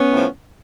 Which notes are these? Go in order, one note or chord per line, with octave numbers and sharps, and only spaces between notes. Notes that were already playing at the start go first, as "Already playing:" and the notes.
Already playing: B3 C#4
A2 F3